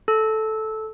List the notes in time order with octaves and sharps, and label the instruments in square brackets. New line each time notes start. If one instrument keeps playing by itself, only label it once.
[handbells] A4